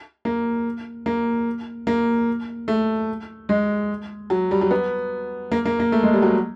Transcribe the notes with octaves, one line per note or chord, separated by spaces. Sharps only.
A#3
A#3
A#3
A3
G#3
F#3
G3
F#3
B3
A#3
A#3
A#3
A3
G#3
G3
F#3